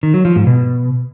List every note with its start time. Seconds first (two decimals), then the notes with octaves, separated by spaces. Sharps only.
0.03 D#3
0.14 F#3
0.25 F3
0.36 G#2
0.47 B2